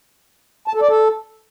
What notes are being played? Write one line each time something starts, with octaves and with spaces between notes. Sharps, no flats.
A5
A4
D5
A4